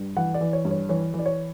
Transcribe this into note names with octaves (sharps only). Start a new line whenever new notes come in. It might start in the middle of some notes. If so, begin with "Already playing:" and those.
Already playing: G2
E3 F#5
D5
E3
C#5
G2
C#5
E3 C#5
E3
D5
C#5